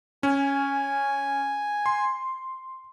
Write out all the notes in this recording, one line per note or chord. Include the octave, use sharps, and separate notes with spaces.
C#4 G#5
C6